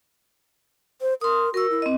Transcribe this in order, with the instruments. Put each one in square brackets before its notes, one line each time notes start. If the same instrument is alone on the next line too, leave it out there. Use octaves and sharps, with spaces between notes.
[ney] C5
[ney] A#4 [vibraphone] C6 D#6
[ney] F#4 [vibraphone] A#4 E6
[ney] E4
[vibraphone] C4 D#5